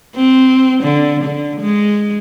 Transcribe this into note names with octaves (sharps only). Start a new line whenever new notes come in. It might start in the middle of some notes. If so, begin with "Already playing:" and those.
C4
D3
D3
G#3